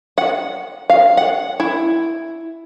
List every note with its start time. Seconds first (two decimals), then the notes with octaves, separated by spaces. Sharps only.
0.18 F#5
0.90 F5
1.17 F#5
1.60 E4